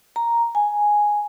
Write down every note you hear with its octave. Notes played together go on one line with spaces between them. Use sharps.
A#5
G#5